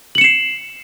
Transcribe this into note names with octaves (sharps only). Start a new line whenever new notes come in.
C7 C#7 E7 F#7